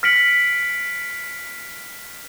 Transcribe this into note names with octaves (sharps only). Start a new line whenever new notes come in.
F6 A#6 B6 C#7 D7 F#7